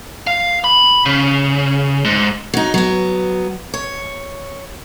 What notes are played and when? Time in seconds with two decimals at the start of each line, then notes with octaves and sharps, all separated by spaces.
0.27 F5
0.64 B5
1.06 C#3
2.05 G#2
2.54 F#3 D#4
2.74 F#3 B3
3.74 C#5